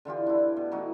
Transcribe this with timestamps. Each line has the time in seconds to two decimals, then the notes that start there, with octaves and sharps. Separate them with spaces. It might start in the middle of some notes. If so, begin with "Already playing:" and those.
0.05 D3 E3 F4 G4
0.27 D4 E4
0.57 B2
0.71 E3 A3 D#4 F#4